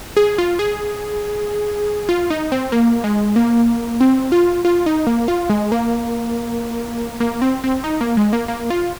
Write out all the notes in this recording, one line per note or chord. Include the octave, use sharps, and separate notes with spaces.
G#4
F4
G#4
F4
D#4
C4
A#3
G#3
A#3
C4
F4
F4
D#4
A#3
F4
G#3
A#3
A#3
C4
C4
D#4
A#3
G#3
A#3
A#3
F4